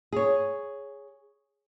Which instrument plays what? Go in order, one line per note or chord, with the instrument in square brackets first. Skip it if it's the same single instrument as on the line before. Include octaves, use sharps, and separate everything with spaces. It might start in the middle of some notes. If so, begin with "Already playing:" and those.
[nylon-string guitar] G#4 C#5